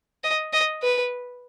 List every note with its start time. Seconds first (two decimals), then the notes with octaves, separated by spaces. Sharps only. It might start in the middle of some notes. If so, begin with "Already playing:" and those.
0.24 D#5
0.53 D#5
0.83 B4